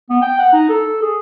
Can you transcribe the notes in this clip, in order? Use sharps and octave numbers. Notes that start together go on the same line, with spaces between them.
B3
G5
F#5
D#4
A4
G#4